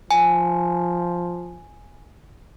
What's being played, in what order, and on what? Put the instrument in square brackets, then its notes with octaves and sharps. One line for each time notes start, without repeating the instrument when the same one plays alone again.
[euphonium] F3 [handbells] G#5